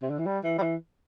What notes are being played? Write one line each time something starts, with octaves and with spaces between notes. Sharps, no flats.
C3
D3
E3
G3
E3
G3
E3